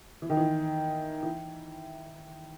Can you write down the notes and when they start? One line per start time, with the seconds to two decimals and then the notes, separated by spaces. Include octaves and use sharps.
0.22 E3
0.30 D#3
0.37 E3
1.23 E3